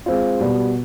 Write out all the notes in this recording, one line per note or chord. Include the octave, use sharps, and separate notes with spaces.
G#3 C4 F4
B2 G3 B3